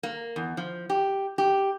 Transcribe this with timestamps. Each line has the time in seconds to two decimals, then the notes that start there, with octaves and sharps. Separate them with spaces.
0.03 A#3
0.36 E2
0.57 F3
0.90 G4
1.38 G4